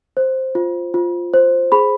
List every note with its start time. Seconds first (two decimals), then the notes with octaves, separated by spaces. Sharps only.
0.17 C5
0.55 F4
0.94 F4
1.34 C5
1.72 G#4 B5